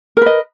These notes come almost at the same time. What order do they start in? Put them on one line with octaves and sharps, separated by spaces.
A#4 B4 D#5